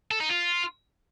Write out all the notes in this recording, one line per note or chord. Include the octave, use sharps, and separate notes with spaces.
A4
D#4
F4